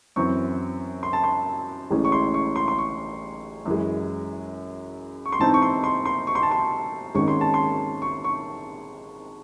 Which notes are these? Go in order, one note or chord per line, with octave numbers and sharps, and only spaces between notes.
F#2 E3 C4 C#6
C6
A5
C6
A1 A2 G#3 C#4
C#6
C6
C#6
C6
C6
C#6
F#2 E3 G#3
C#6
C6
G#2 E3 C4 D#4 A5
C#6
C6
C6
C6
C#6
C6
A5
C6
G#1 G#2 D#3 G#3 C#4 C#6
C6
A5
C6
C#6
C#6